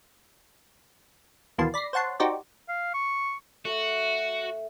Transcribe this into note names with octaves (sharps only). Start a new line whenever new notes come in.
D#2 B2 E3 A#3 A5 C6
D5 B5 A#6 C7
C5 C#5 F#5 A5 C6
D#4 F#4 G4 C5 D5
F5
C#6
A3 F#4